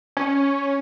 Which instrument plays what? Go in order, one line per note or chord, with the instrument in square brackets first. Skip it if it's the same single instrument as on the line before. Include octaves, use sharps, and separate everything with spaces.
[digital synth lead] C#4